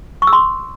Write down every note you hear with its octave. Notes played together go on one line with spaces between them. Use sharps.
C#6
E6
C6